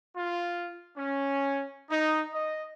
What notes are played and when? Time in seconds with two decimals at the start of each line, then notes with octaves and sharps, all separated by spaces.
0.16 F4
0.97 C#4
1.89 D#4
2.32 D#5